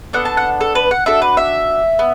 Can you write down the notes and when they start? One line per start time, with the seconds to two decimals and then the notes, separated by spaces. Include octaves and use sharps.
0.13 B3 D4 A4 F#5
0.25 A5
0.37 F#5
0.60 A4
0.75 B4
0.91 F#5
1.06 D4 F#4 A4 E5
1.22 B4
1.37 E5
1.99 B3